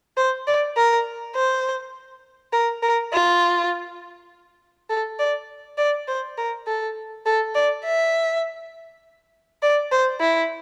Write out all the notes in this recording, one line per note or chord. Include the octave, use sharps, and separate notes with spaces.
C5
D5
A#4
C5
A#4
A#4
F4
A4
D5
D5
C5
A#4
A4
A4
D5
E5
D5
C5
E4